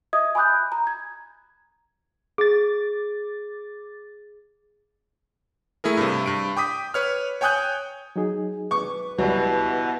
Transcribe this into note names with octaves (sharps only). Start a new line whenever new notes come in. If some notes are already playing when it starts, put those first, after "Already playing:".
D#5 E5 D#6 G#6
G#5 B5 D6 D#6 F#6 G6
A#5
G#6
G#4 D6 A6
A3 E4 G#4 A#4
G2 C3
G2 D7
G5 D6 D#6 B6
B4 C#5 F6
C#5 G5 G#5 D#6 F#6 G6
F#3 D#4 G#4
B4 C#6 D6
C#2 B2 E3 F#3 G3